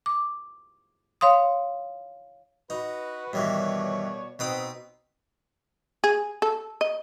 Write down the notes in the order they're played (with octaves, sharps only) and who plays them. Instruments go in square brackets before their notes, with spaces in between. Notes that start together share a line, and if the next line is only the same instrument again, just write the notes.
[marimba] D6
C#5 F5 C6 D#6
[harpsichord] D#4 [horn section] F#4 B4
[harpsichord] G2 D#3 E3 [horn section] B2 C#5 D5
[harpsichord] B2 B4 D#6 [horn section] B3 C4 D#4
[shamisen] G#4
A4
D#5